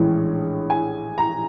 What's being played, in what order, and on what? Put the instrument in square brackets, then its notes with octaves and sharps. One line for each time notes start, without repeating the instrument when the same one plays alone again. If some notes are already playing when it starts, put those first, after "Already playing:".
Already playing: [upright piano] A#1 A2 E3 G#3 C#4
G#5
A#5